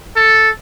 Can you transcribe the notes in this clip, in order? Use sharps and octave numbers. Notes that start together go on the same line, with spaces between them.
A4